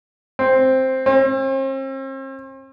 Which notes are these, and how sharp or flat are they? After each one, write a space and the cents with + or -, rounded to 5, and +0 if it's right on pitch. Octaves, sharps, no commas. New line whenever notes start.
C4 +5
C4 +45